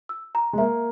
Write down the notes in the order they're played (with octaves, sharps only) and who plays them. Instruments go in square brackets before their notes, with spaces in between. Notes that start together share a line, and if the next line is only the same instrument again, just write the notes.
[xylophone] E6
A#5
[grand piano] G#3
[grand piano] A#3 [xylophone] E5